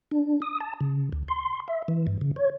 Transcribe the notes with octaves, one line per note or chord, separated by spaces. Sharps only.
D4
D#6
A5
C#3
D2
C6
E5
E3
G2
C#3
C#5